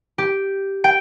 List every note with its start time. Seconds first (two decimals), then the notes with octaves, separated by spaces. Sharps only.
0.18 G4
0.84 G5